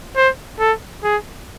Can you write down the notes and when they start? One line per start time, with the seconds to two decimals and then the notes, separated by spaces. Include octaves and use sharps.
0.16 C5
0.59 A4
1.03 G#4